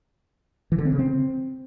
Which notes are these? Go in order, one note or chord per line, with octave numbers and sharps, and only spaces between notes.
E3
D3
C4
C#3
C4